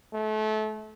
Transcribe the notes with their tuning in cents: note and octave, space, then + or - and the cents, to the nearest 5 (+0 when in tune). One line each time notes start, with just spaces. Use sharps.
A3 -30